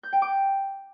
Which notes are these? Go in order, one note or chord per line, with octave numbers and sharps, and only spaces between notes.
G6
G5
D6